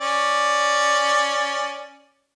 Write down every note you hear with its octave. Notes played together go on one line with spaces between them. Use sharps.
C#4 D5